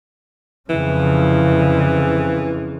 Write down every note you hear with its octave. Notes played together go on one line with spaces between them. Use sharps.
F2 C#3 E3